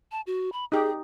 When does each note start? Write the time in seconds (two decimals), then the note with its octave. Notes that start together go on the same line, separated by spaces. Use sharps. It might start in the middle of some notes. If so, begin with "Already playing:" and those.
0.12 A5
0.27 F#4
0.53 B5
0.72 D#4 G4 G#4